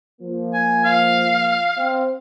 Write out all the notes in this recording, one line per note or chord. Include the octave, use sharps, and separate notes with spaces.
F3 A#3
G#5
F5
C4